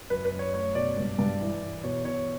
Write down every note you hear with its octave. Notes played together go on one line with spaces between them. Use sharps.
F#2 B4
B4
F#2
C#5
A3 C#5
B2 D5
G2
G2
E3
E3
B2 C#5
B2 C#5